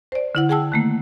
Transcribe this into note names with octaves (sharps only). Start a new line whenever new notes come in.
C5 D5
D3 E4 F#5
G#4 F#5 G5 A5 E6
D#3 A3 A#3